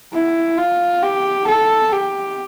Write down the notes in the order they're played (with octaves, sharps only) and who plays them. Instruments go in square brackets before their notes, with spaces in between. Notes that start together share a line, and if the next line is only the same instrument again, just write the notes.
[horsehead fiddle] E4
F4
G4
A4
G4